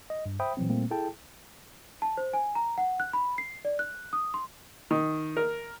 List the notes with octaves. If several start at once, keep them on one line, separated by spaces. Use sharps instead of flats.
D#5
G2
C5 E5 G5 B5 D#6
A#2 E3 F#3 C4
A#2 G3 A3 A#3 C4
E4 G#4 A4 G5 A5
A5
C5
G#5
A#5
F#5
F#6
B5
C7
D5
F#6
D#6
C6
D#3
A#4